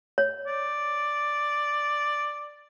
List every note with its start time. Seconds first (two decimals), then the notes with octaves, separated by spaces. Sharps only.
0.18 C#5
0.47 D5